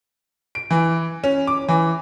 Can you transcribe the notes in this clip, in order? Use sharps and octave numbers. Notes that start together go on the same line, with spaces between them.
D7
E3
C#4
D6
E3